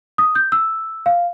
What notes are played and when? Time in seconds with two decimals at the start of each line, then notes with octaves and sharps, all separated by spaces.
0.18 D#6
0.35 G6
0.52 E6
1.06 F5